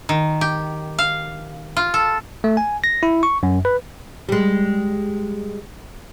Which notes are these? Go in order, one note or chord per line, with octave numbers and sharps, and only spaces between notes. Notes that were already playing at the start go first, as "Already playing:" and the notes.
D#3
G4
F5
F4
A4
A3
G#5
A#6
E4
C#6
F#2
B4
G3 G#3